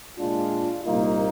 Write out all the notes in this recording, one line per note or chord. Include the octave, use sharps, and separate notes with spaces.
A#2 G#3 D4 F4
C2 A#2 G3 A#3 D#4 F4